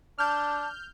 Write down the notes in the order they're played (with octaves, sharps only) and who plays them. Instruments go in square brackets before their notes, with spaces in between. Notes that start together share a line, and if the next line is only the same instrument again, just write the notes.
[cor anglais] D4 [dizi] A5 [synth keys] F6 G6